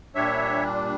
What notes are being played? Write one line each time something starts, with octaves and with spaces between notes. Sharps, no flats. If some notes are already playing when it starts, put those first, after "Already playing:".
A#2 G3 D4 C#5 E5